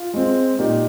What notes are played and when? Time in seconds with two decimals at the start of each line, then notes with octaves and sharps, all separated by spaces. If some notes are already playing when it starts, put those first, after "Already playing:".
Already playing: F4
0.14 G#3 C4
0.59 A#2 D#4 G4